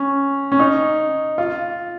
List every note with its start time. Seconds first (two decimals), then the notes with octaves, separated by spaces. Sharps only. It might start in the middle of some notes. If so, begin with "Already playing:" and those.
Already playing: C#4
0.52 C#4
0.60 D#4
1.38 F4